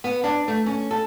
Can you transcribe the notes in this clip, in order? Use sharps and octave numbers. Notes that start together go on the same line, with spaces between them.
B3
D4
A3
C#4
A4